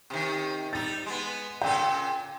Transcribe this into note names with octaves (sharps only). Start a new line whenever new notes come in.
C3 D#3
G3 D#4 A6
G#3 B3
A#2 C#3 A4 G5